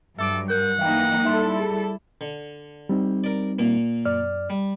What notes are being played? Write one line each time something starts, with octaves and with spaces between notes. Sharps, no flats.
G2 F#3 A4 E5 D6 D7
A#4 F#5 G6
E3 A#3 D#4 F5 G5
G3 D#4 E4 A4 E5 C6
G#4
D3
G3 C4 D#4
A#4 D5
A#2 A#3
F#2 D5 F6
G3